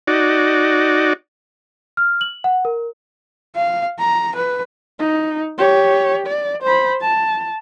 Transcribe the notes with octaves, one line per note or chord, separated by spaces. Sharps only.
D#4 F#4 D5
F6
F#7
F#5
A#4
F5
A#5
B4
D#4
G4 C#5
D5
C5 B5
A5